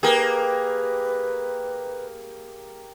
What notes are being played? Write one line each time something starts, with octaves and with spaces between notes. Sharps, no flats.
A#3 G4 G#4 A#4 B4